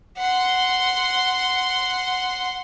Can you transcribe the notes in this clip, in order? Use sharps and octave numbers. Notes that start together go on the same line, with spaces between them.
F#5 C6